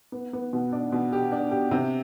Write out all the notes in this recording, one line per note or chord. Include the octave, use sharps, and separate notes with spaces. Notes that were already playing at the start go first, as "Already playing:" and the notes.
B3
B3
B2
D4
B2
G4
D4
G4
C3